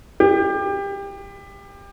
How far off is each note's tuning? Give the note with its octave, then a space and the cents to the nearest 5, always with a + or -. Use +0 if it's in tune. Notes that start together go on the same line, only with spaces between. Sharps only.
G4 +25